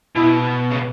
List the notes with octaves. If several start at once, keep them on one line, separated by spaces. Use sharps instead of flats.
B2 E4
C#3